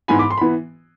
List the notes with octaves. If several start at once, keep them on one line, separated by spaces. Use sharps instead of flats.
G#2 E3 B3 G#5 B5
B5 D6
C6
B5
E3 B3